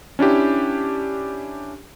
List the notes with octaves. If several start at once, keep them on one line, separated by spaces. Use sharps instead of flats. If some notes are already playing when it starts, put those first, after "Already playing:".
C#4 D4 E4 G4